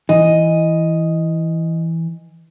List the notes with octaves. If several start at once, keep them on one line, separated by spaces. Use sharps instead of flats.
E3 D#5